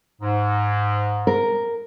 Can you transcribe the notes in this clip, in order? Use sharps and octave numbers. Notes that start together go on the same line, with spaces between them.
G#2
A#4